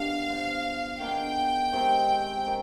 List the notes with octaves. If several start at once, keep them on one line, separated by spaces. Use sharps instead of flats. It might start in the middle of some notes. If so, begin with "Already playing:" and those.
Already playing: G2 D#3 B3 D4 F5
B3 F4 C5
D#3 B3 D4 G#4 G5
C3 D#3 G#3 C4
D#3